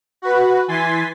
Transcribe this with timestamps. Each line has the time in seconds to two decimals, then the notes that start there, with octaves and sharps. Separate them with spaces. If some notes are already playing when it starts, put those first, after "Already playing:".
0.22 F#4 B4
0.68 E3 G#5 C6 A6 B6